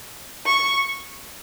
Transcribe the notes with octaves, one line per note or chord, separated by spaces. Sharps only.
C#6